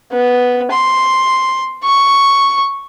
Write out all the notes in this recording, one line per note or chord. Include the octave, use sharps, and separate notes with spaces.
B3
C6
C#6